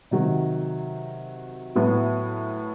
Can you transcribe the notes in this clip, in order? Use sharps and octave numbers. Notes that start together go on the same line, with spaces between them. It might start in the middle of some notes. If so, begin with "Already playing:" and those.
C3 D#3 F#3
A2 F#3 B3